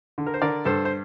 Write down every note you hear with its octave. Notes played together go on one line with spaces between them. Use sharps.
D3
A#4
C5
D3 A#4 D5
G2 A4 C5
C5